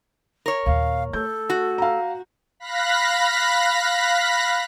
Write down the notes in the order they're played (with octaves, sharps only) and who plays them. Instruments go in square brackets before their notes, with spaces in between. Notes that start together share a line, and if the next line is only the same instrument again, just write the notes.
[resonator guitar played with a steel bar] A#4 C#5
[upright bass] D#2 A#2 [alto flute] F5
[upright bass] A3 [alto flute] A4 [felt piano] G6
[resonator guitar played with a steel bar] F#4
[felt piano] F5 A#5
[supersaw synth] F5 B5 F#6 A#6 B6